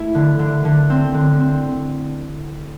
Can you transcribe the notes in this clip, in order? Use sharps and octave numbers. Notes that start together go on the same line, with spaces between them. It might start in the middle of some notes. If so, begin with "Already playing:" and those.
Already playing: A3 E4
D3
D3
D3
C4
D3
C4